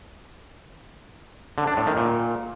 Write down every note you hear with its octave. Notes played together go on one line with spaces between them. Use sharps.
D3
D4
A2
D#3
A#2